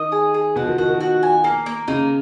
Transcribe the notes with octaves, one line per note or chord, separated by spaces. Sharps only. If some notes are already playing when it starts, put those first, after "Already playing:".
Already playing: D#3 D#5
G#4
G#4
B2 F#4
F3
D#3
D#3 F#4
D#3
F#4
G#5
A#3
A#3
C#3 D#4